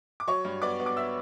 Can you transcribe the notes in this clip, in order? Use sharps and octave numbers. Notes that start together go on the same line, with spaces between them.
D6
F#3 C#5 C#6
G2
B3 D5 D6
B3
D6
E5 E6